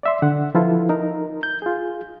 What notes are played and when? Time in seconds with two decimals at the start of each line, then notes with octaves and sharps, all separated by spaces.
0.03 D5 E5 C6
0.22 D3 F#5
0.55 F3 E4 F4 A4 B4
0.89 D#4 A#4
1.43 G6
1.62 F4 G#4